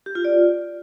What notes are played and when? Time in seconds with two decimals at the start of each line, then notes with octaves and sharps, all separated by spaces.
0.06 G4
0.15 F4
0.25 D5